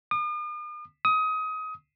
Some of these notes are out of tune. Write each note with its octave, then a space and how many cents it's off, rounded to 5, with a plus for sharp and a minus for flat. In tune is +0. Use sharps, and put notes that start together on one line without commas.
D#6 -45
D#6 +25